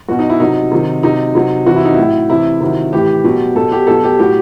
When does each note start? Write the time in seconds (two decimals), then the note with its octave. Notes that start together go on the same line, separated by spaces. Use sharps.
0.08 B2 F#3 F#4
0.19 D#4
0.30 E4
0.40 C3 F#3 D#4
0.72 C3 D#3 F#3
1.03 C3 F#3 D#4
1.35 C3 F#3
1.66 C3 E3 F#4
1.76 E4
1.85 D#4
1.94 A2 F#3 E4
2.30 C3 E3 E4
2.61 C3 D#3 F#3
2.93 A2 E3 G4
3.24 B2 F#3
3.55 B2 F#3 A4
3.72 G4
3.87 B2 F#3 A4
4.04 G4
4.19 A2 F#3 G4